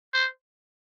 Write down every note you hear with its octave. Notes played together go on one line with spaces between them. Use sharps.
C5